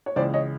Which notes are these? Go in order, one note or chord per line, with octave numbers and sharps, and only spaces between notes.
C#5
C#2 C#3 E3 C5 D5
C#5 D#5